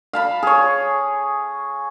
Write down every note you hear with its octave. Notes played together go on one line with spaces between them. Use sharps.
F5 A5 B5
G#4 C#5